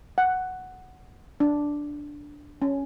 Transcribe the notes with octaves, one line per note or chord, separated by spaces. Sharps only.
F#5
D4
C#4